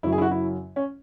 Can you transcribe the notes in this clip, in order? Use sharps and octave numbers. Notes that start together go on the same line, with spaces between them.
F#2 C#3 F#3 E4
G#4
E4
F#4
E4
C#4